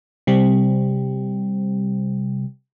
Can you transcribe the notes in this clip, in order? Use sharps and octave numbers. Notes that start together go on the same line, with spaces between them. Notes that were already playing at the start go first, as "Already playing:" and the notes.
C3 G3